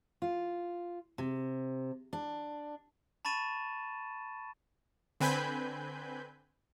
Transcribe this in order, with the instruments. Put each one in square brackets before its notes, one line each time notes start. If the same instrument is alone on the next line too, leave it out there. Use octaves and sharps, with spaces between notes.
[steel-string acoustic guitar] F4
C3
D4
[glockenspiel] A5 B5 C#6 A6 D#7 E7
[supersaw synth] D3 C4 B4 G#5 B5 G6